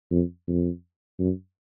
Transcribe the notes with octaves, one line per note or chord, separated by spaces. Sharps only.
F2
F2
F#2